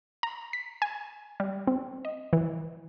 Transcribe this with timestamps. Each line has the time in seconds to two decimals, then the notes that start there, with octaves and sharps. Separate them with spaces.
0.23 A#5
0.53 B6
0.82 G#5
1.40 G3
1.67 C4
2.05 D#5
2.33 E3